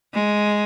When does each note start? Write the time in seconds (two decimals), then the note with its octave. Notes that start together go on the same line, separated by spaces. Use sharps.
0.14 G#3